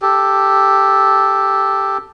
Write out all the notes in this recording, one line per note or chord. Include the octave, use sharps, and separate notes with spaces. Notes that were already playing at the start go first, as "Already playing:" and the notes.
G4 A4